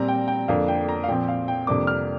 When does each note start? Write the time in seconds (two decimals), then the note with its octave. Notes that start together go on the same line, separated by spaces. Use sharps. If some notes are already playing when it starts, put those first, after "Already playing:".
Already playing: A#2 G3 C4 A#5
0.08 G5
0.28 G5
0.48 F2 D3 A#3 D4 F5
0.68 G5
0.89 A#5
1.04 F5
1.08 A#2 F3 C4 G5
1.28 F5
1.48 G5
1.67 F2 C3 G3 A#3 D4 D6
1.87 F6